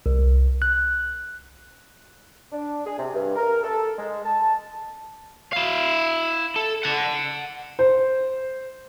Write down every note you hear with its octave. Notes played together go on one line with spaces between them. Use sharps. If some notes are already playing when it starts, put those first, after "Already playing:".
C2
F#6
D4
G#4
C3
G2
A#4
A4
G#3
A5
E4 F5
A4
F#5 A5
C5